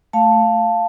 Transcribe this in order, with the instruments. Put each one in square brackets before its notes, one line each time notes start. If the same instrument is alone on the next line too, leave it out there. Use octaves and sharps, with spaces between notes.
[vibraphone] A3 F5 A5